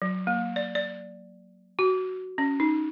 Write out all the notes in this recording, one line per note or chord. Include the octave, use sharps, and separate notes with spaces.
F#3
A#3
D5
D5
F#4
C#4
D#4